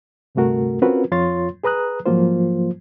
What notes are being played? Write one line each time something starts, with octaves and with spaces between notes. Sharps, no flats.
D2 G2 C3 A3 F#4 A#4
C4 C#4 F4 F#4 A#4 B4
F2 F4 C#5 C6 A6
G#4 B4 A#5 D#6 F#6
G#2 F3 F#3 A#3 F4 C5